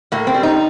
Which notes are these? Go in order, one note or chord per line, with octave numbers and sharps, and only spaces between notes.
A2 A#3
C4
G3
D#4